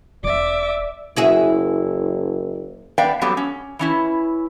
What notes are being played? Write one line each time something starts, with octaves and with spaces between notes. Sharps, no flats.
E1 D5 E5 D6
F#1 E4 F#4 G#4
B3 D5 E5 F5 G5
F#3 G3 A3 B3 C4 G4
C#4
E3 C#4 E4